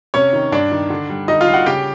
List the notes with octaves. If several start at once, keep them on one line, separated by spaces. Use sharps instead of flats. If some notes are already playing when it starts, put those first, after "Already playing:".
C3 C#4 C#5
D#3
G2 D4 D5
D#3
D3
G3
D3 D#4 D#5
F4 F5
G3
F#4 F#5
C#3 G4 G5